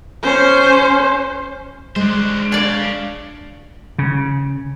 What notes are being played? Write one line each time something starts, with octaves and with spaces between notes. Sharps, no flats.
C#4 C5
G#3 D4 C5
D4 C#5 D5 F5
C#3